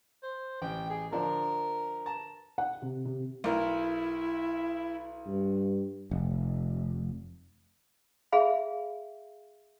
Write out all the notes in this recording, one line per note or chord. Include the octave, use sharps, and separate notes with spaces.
C5
A1 G5
G#4
D3 F3 D4 A#4
A5 A#5
F#5
C3
C3
B1 E4 A#4
G2
F1
G#4 E5 F5 B5